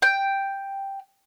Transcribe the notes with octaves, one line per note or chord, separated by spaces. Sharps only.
G5